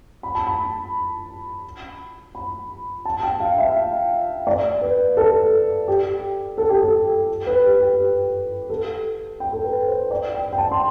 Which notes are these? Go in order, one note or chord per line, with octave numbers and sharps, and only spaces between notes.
B5
A5
B5
B5
A5
G5
F5
E5
D5
B4
A4
G4
A4
G4
A4
B4
G4
G4
A4
G5
A4
B4
C5
D5
G5
G5
A5
C6